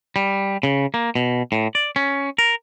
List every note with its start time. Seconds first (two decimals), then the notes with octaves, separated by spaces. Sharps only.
0.16 G3
0.63 C#3
0.94 A#3
1.15 B2
1.52 A2
1.75 D5
1.96 C#4
2.38 A#4